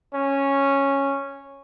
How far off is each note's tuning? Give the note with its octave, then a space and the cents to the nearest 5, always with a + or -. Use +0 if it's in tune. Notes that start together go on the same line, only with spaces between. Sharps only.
C#4 -5